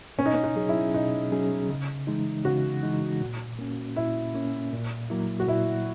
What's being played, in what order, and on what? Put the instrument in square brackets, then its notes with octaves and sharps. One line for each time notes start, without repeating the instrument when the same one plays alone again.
[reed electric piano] B2 [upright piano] C#4
[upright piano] D#4
C#4
D#4
[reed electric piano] F#3 C#4 G#4
[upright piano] E4
[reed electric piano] B2 [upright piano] D#4
[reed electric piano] F#3 C#4 G#4
C#3
E3 G#3 D#4
[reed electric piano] C#3 [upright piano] F#4
[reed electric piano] E3 G#3 D#4
A#2
A#3 C#4
[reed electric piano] A#2 [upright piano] E4
[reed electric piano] A#3 C#4
A#2
F#3 A#3 E4
[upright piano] F#4
[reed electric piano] A#2 [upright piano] E4